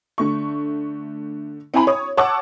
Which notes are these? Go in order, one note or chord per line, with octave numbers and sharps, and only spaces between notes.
D3 A3 C#6
C4 E4 G5 G#5 A#5 B5
C#5 D#6
C#5 F#5 A5 C#6 D6 E6